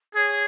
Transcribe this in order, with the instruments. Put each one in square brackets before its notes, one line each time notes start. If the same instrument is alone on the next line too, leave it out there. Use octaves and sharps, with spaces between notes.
[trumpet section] G#4 [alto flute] C#5